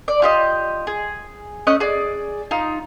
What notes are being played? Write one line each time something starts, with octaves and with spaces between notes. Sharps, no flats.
D5
F4 G4 D#5
G#4
A3 C#4 D#5 F#6
G#4 D5
D#4 F4